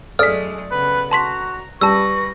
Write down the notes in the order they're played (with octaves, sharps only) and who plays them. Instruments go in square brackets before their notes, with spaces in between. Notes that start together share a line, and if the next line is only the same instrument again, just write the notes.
[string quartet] F#2 G#3 A3 [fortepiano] A4 D5 D#6 [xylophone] F6 B6
[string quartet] C#3 B3 F#6 [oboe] B4
[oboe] F#4 [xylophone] A5 C6 B6 [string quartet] A#5
[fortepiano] G3 [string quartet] B4 A#6 [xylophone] A5 E6 [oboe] C#6